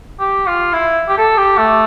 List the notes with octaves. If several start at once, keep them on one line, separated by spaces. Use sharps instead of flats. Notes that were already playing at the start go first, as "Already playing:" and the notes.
G4
F4
E4
G4
A4
G4
A3